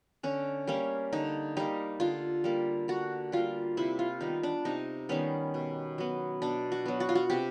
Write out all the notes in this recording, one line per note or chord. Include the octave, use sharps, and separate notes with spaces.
D3 C#4
G3 A#3 C#4
D3 D#4
G3 A#3 D#4
D3 F4
G3 A#3
D3 F#4
G3 A#3 F4
C3 E4
F4
D#3 G3 B3 D#4
D4
C3 D#4
D#3 G3 B3 C#4
B2
F#3 B3
B2 D4
F#4
F#3 B3
F#4
F4
F#4
C3 G4